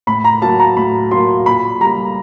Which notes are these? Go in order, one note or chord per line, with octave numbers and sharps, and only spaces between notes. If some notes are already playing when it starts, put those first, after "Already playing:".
A2 B5
A#5
F#3 A#3 A5
A#5
A2 B5
F#3 A#3 C6
A#2 B5
G3 A#3 A#5